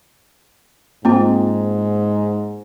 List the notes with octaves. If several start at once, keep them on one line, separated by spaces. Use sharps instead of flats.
G#2 A#3 C4 F4